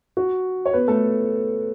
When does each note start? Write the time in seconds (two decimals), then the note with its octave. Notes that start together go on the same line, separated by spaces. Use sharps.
0.17 F#4
0.65 C#5
0.73 B3 B4
0.88 A3 A4